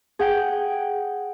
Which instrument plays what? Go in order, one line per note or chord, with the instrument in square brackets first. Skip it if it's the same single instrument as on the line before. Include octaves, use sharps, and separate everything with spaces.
[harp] G#4 F#5 G5